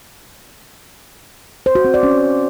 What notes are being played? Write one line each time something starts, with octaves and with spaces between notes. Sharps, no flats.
C5
F#4
C4
D5
C#4